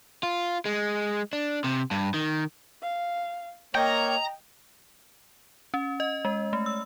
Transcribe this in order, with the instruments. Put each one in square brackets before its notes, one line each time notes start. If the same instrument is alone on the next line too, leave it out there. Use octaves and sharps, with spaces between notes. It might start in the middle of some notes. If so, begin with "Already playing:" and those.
[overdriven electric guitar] F4
G#3
D4
C3
G2
D#3
[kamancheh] F5
[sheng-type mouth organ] A#3 C#5 [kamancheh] D#5 [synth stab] G5 [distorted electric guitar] A#5
[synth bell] C#4
D#5
G#3
A3
E6